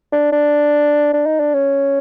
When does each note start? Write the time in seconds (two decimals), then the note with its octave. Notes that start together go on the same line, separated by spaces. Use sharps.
0.12 D4
0.32 D4
1.14 D4
1.26 D#4
1.40 D4
1.54 C#4